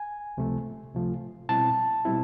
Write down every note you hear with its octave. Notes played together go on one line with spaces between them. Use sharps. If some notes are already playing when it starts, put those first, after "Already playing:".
Already playing: G#5
C#2 C3 F3 A3
C#2 C3 F3 A3
B2 G3 C4 E4 A5
B2 G3 C4 E4